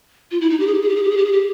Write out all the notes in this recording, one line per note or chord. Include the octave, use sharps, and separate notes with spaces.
F4
E4
D#4
G4
G#4
G4
G#4
G4
G#4
G4
G#4
G4
G#4
G4